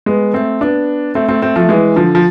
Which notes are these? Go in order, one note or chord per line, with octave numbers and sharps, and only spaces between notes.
G#3 B3
A3 C4
B3 D4
A3 C4
A3 C4
A3 C4
F3 A3
E3 G#3
D3 F3
F3